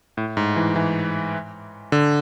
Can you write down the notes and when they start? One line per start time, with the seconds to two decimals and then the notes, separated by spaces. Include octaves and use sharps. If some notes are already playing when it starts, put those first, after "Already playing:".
0.17 A2
0.37 G#2
0.56 E3
0.76 E3
1.92 D3